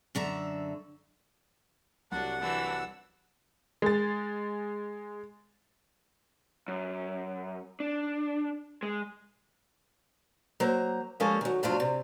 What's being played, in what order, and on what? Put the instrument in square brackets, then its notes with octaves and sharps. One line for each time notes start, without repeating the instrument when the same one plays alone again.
[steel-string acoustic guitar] F#2 D3 E5 A#5
[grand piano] C2 F#3 [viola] D4 [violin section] F#4 [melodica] F#5
[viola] E3 D4 [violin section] F#4 E6
[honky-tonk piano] G#3 A6
[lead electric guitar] F#2
D4
G#3
[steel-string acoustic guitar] F#3 A#3 C5 A#5
F3 G3 G#3 A#3 C#4 A4
D#3 F#3
F2 A2 C3 F#3 D4 F4
C3